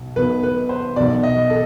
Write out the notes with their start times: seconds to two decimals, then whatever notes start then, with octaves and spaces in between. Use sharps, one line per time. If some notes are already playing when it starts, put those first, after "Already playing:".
Already playing: B1 B2
0.16 B1 B2 B4
0.43 B4
0.69 C5
0.96 B1 B2 D5
1.23 D#5
1.50 A4